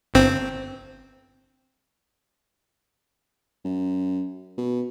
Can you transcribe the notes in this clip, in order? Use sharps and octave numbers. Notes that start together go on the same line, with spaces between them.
G1 C4
F#2
B2